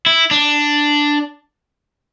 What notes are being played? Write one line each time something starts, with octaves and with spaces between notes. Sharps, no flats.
E4
D4